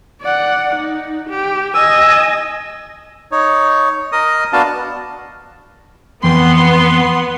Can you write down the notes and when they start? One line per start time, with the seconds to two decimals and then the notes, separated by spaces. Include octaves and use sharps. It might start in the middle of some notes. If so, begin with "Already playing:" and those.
0.22 D5 F#5
0.76 D#4
1.29 G4
1.74 D#5 G#5 E6
3.31 D#4 C#5
4.12 A#4 D#5 D#6
4.53 B3 D4 F#4 F5 A5
6.23 F2 E3 B3 G5 C6